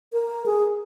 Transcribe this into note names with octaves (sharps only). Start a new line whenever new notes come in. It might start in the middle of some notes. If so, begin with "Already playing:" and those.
A#4
G#4